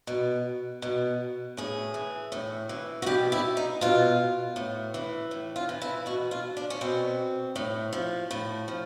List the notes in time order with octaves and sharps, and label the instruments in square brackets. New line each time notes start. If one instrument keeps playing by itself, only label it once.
[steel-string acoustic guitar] B2
B2
A2 G#4
E3
A2
E3
F#4
B2 G4
E4
D#4
B2 F4
A2
E3
A2
F4
E3
E4
B2 F#4
F4
D4
C#4
B2 C4
A2
F3
A2
F3